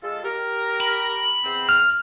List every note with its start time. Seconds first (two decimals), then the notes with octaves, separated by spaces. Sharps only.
0.03 G#3 F4 A4
0.24 G4 A#4
0.80 B5
1.43 E2 C4
1.69 F6